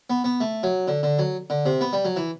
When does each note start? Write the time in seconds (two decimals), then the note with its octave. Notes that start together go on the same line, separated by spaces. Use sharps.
0.10 B3
0.24 B3
0.41 A3
0.63 F#3
0.88 D3
1.03 D3
1.19 F#3
1.50 D3
1.66 C3
1.81 B3
1.93 G3
2.05 F#3
2.16 E3